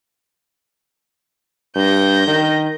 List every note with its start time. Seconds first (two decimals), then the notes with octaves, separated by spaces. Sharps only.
1.76 G2 G6 A#6
2.27 D#3